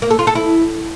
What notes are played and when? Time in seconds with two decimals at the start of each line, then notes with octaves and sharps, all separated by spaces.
0.02 A#3
0.10 A4
0.19 F4
0.27 A4
0.35 E4